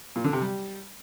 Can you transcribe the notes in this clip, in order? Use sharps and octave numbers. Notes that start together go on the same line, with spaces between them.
A#2
D3
C3
G3